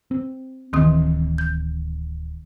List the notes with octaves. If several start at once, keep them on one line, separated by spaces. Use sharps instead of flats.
C4
D1 D#3 E3 C4 D#6
G6